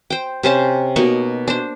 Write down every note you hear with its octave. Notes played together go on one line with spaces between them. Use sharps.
C5 G5
C3 C#4 C5 A5
B2 A#3 D#4 C#6
D4 C5